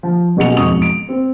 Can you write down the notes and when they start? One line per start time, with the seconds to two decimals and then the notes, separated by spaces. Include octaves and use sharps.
0.03 F3
0.37 F#1 B2 F#4 G#4 C#7 F7
0.57 E1 F2 G#2 C#6 D#6 F7
0.82 D7
1.09 C4 C5